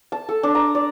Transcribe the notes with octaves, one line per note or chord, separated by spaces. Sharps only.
A5
A4
D4
A#5
D5